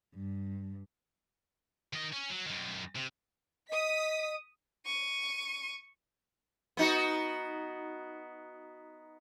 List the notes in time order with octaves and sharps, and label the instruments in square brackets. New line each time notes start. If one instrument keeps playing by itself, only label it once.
[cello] G2
[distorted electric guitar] D#3 D#5
C#4
F#3
F#2 D#3
C3
[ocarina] D#5 [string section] D#6 B6
[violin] C#6 D#7
[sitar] B3 D#4 F#4